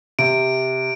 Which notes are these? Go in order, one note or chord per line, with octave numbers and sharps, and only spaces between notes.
C3 D7